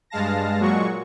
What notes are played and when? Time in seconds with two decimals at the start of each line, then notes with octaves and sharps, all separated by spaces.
0.10 G2 G#3 F5 A5 A#6
0.59 A#2 F#3 G#3 F#4 C#6